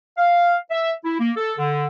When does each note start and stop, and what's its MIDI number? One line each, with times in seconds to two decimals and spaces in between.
0.17 0.55 77
0.71 0.91 76
1.05 1.16 64
1.19 1.31 58
1.37 1.53 69
1.58 1.87 50